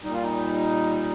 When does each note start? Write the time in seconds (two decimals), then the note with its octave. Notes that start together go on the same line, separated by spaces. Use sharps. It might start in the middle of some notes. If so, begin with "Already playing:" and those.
0.04 A#2 G3 D#4
0.14 F4
0.23 D#4